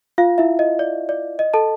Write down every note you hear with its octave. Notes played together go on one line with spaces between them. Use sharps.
F4 F5
E4 E5
D#5
D5
D5
D#5
A4 A5